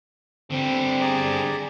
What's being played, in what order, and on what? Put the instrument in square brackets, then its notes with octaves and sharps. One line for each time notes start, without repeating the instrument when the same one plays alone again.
[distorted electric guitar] D3 G3 [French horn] C4
[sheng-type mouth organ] G#4 D5 A#5